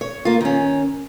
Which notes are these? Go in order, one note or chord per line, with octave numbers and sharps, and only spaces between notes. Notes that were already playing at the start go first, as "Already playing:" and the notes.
C#5
A#3 F4
D#3 C#4